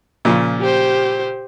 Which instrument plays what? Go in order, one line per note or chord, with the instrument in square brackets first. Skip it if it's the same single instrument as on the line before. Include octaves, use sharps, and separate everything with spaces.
[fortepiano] A#2 C#3 F3
[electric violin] G4 C5